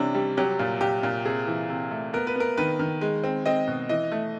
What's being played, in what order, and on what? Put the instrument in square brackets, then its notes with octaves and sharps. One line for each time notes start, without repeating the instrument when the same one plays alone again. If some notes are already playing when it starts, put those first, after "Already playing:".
Already playing: [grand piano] C3 E3 G3 C#4 D4
G3
F#3 G4
A#2
A#2 G4
A#2
C3 G#4
E3
C3
A3
B3 A#4
B4
B3 A#4
D#3 B4
D#3
G#3
C4
C4 D#5
B2
E3 D#5
A3